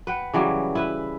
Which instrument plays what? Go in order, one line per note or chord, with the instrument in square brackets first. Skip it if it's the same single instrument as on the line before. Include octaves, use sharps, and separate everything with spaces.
[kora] B4 F#5 G5
C#3 E3 F#3 G3
E4 B4 E5